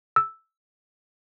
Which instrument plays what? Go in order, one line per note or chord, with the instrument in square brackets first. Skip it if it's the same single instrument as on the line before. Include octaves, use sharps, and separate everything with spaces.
[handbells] E6